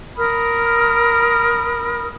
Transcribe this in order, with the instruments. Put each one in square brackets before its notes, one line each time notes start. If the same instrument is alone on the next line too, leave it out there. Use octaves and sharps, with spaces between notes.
[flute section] A#4 B5 D#6 F6